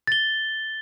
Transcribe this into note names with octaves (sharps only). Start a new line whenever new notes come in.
A6 G7